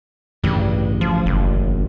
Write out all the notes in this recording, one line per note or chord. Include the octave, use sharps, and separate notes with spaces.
A1 D2 G2 C#3
F3
F#1